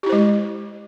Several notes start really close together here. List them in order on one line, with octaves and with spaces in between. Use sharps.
G4 E4 C5 G#3